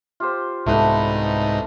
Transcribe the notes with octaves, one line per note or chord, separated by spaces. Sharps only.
F4 G4 C5
C2 G#2 A3 B3 D#4 B4